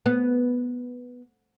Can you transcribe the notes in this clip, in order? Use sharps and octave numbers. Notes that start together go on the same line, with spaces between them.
B3